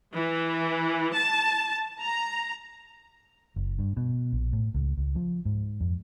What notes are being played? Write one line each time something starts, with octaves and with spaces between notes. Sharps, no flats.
E3
A5
A#5
F#1
G2
B2
A#1
A2
C#2
C#2
F3
G#2
F2